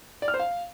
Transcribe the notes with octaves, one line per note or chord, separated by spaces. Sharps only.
D5
F6
C5
F5